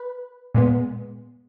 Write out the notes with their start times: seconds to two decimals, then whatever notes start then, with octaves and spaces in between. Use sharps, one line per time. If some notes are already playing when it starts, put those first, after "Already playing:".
Already playing: B4
0.54 A#2 G#3 B3